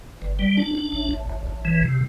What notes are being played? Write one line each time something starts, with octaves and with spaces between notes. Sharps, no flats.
G1
G3
D4
D4
A1
A1
A1
A1
E3
C3